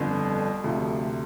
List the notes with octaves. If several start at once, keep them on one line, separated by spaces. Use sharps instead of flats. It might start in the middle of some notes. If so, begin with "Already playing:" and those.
Already playing: G1 F2 D3
D2 C3 F3